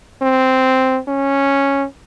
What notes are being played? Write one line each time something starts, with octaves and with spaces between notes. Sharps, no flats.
C4
C#4